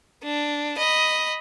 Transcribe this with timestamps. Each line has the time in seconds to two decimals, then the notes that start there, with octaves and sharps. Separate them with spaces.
0.23 D4
0.77 D#5 B5